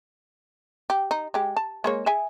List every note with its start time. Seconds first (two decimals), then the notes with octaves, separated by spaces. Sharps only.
0.90 G4
1.11 D#4
1.34 G#3 G4
1.56 A5
1.84 G#3 A#3 C#5
2.06 G#4 E5 G#5